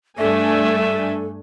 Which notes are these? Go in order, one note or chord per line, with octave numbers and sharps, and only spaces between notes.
G2 A3 D4 A4 E5 G#5